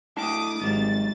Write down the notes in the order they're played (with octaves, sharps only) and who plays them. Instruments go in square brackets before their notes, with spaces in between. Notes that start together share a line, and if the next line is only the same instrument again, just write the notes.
[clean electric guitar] A2 D4 A5 [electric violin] D6 D#6
[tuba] G#1 [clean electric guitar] G#2 F#3 G3 [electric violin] A6